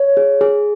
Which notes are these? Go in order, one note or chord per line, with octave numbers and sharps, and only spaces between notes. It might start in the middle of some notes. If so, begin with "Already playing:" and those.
Already playing: C#5
G#4
G#4